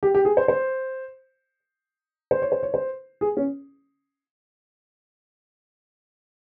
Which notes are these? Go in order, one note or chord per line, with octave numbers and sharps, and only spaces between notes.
G4
G4
G#4
C5
C5
C5
C#5
C5
C#5
C5
G#4
C#4